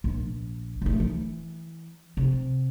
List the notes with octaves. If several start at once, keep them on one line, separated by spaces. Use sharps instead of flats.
A#1
A#1 A3
E3
C3